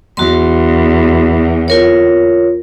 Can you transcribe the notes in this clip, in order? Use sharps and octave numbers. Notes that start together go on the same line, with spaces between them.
E2 F#4 C6
F4 A#4 C#5